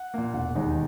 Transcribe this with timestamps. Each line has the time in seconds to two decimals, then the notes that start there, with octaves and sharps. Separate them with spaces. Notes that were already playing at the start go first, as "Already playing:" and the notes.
Already playing: F#5
0.14 A#2 A#3
0.34 E1 F#5
0.55 D#2 D#3 G#3 D#4